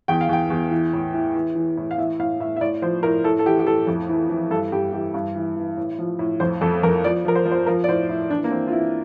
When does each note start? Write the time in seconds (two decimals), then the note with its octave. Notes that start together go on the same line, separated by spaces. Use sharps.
0.08 E2 G5
0.21 F5
0.29 E2 G5
0.50 E2
0.71 E3
0.93 A2
1.14 E3
1.35 E3
1.55 E3
1.77 A2
1.91 F5
1.98 E3 E5
2.19 A2 F5
2.40 A2 E5
2.56 E5
2.61 A2 D5
2.82 F3 C5
3.03 A2 A#4
3.24 A2 A4
3.39 A4
3.46 E3 G4
3.59 G4
3.67 A2 A4
3.87 F2
4.09 E3
4.30 E3
4.50 G2 A4
4.72 G2 G4
4.93 E3 G4
5.14 G2
5.35 E3
5.56 E3
5.77 A2
5.99 F3
6.19 A2
6.40 F2 C5
6.61 F2 A4
6.83 F2 A#4
7.04 F3 D5
7.25 F3 A#4
7.35 C5
7.45 F3
7.52 C5
7.66 F3 A#4
7.84 D5
7.88 A2 C5
8.09 A2 E4
8.30 E3 D4
8.44 A#3
8.51 E3 C4
8.68 F4
8.72 E3 E4